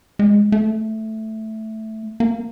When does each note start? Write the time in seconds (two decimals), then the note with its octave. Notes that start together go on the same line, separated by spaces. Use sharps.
0.19 G#3
0.52 A3
2.20 A#3